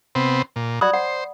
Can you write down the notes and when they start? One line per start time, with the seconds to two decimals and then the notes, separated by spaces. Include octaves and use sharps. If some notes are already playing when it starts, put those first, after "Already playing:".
0.15 C3 B3 C4
0.56 A#2
0.81 F#4 D5 B5 D#6
0.93 C5 F#5